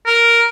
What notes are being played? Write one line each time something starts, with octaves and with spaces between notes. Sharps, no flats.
A#4